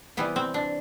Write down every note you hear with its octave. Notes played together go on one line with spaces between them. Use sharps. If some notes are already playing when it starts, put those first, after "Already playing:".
C3 E3 G3 B3
C4
D4